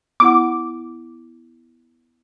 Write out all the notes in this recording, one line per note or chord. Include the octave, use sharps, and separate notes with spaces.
B3 E4 F#5 D6